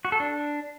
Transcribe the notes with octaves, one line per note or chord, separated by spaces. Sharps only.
F#4
A4
D4